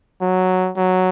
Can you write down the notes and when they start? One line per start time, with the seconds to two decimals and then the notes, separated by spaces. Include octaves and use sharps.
0.21 F#3
0.77 F#3